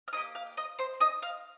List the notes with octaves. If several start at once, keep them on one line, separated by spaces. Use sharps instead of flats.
F6
A#3 G4 D#5 D#6
F5 F6
D#5 D#6
C5 C6
D#5 D#6
F5 F6